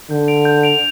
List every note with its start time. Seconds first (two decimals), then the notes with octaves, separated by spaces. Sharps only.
0.11 D3 G6
0.28 D7 F7
0.45 G6
0.63 D7 F7